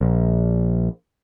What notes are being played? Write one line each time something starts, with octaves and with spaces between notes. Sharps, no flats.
A#1